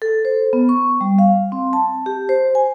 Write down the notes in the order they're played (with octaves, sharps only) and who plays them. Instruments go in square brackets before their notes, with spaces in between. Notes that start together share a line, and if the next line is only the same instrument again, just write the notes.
[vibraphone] A4
C5
B3
C#6
G3
F5
C4
A5
G4
C5
G#5